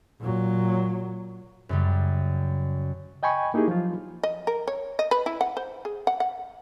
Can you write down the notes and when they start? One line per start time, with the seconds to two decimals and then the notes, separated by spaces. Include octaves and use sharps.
0.21 A#2 F#3
1.69 F#2 C#3 G3
3.23 D#5 G5 G#5 B5 C#6
3.54 A#3 D#4 E4 G4 G#4
3.68 F3 F#3 F4
4.23 D#5
4.47 A#4
4.68 C#5
4.99 D#5
5.11 B4
5.26 E4
5.41 F#5
5.57 C5
5.85 G#4
6.07 F#5
6.20 F#5